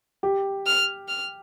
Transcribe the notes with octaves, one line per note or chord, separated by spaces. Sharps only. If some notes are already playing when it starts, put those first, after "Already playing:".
G4
F6
F6